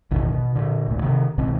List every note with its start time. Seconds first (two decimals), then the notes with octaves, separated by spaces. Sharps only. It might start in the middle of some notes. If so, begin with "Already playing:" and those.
0.11 A1 E2 B2 D#3
0.32 B2
0.55 A#2 D3
0.87 G1 D2 A#2
1.03 C3 D#3
1.38 C2 B2 D#3 C4